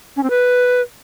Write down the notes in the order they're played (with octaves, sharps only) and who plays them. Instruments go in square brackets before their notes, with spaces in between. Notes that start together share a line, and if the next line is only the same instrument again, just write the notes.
[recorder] C#4
C4
B4